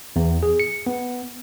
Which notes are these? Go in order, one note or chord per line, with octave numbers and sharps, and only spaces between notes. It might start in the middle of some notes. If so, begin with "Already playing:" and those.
E2
G#4
C#7
B3